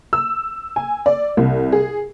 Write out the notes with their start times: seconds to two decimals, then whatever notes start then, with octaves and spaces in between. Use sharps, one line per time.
0.13 E6
0.76 G#5
1.06 D5
1.37 C2
1.72 G#4